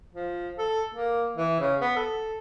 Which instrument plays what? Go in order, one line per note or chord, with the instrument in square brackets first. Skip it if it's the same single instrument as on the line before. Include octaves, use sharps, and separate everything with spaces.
[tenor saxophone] F3
A4
A#3
E3
C#3
B3
A4